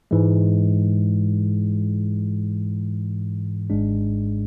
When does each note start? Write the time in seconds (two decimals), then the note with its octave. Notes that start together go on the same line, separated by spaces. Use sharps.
0.11 G#2 E3 G#3
3.70 G#1 G#2 G#3 D4